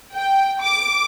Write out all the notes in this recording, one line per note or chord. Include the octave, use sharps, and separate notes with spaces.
G5
D6